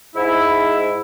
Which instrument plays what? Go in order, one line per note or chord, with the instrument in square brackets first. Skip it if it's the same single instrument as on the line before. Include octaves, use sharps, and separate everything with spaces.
[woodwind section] G#2 E4